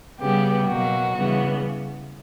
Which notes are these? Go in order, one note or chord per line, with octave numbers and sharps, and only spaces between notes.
C#3 G3 B3 G4
B2 F#3 A#3 F#4
C#3 E3 G3 B3